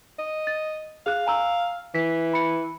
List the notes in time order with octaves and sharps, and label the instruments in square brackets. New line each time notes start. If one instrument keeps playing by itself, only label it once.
[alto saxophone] D#5
[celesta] A6
[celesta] G#4 F#6 [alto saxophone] F5
[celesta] G#5 A#5 E6
[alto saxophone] E3 [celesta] B6
[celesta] B5 C#7